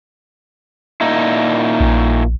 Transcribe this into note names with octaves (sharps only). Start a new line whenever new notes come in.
A#2 D#4 E4
A#1